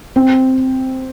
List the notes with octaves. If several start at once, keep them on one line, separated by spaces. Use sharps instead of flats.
C4